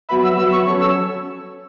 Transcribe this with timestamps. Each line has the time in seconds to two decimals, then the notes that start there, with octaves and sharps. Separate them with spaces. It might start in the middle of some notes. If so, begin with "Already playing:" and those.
0.09 F#3 B3 F#4 B4 E5 B5
0.23 E6
0.37 F#3 B3 F#4 B4 E5 E6
0.52 C#6
0.66 F#3 C#4 A4 C#5 C#6
0.80 E6